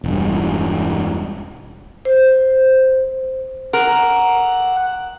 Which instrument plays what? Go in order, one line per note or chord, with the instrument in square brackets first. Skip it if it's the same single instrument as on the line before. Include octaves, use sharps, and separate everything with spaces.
[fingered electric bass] E1 G2
[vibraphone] C5
[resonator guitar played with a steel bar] A#4 [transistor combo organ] F#5